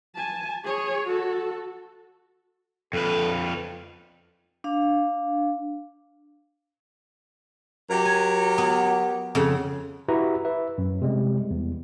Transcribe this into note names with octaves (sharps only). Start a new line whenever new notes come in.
G#5 A5
G#4 C#5
F#4 A4
F2 A4 B4
D4 F5
F#3 G4 A#4
G#5
B3
F2 C#3 F#5
E4 F#4 G4 B4 E5 A#5
B4 E5
F#2
C3 G3 G#3
E2